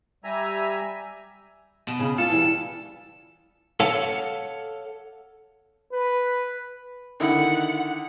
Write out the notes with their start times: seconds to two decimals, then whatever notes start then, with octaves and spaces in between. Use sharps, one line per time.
0.24 G3 E5 G#5 A#5
1.88 B2
1.99 C#3
2.18 F4 A4 A5
2.30 E3 G3
3.80 A4 C#5 F5 F#5 A5
5.93 B4
7.20 D3 D#3 E4 F#5